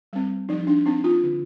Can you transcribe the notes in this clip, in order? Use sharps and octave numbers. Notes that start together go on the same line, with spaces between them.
G3 C4
F3 D#4
D4
C4 D#4
F4
D3